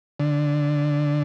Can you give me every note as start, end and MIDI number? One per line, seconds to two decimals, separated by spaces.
0.20 1.23 50